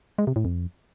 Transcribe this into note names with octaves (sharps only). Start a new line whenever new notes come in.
G#3
C3
A2
F2